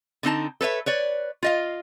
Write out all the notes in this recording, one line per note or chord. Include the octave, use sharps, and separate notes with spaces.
D3 C4 D#4 A5
A4 B4 C#5 E5
B4 C#5 D5
F4 D#5 F5